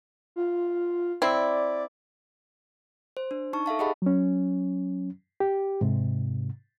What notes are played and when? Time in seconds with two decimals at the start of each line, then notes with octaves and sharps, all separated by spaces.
0.36 F4
1.22 C4 E4 D5
3.17 C5
3.31 D4
3.53 D#4 A5 C#6
3.66 A4 E5 F5 A5
3.79 G4 G#4 D#5 F#5 A5 B5
4.02 F#3 C#4
5.40 G4
5.81 G#2 C3